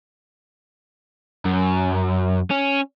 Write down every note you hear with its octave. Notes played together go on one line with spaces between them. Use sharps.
F#2
C#4